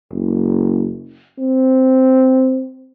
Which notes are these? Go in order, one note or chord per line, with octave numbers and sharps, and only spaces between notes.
F#1
C4